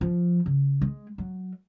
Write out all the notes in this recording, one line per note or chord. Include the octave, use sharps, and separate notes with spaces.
F3
C#3
G#3
F#3